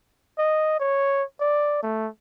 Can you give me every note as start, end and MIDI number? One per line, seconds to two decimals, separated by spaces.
0.38 0.76 75
0.80 1.23 73
1.40 1.81 74
1.83 2.08 57